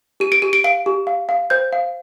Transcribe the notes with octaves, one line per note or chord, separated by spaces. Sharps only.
G4 D#7
D7
G4 D#7
D7
F5 D7
G4
F5
F5
C5 G6
F5